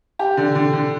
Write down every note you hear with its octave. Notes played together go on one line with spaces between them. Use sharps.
G4
D3
D3
D3